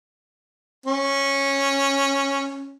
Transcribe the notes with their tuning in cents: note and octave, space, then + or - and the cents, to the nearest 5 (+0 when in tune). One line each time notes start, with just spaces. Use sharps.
C#4 -10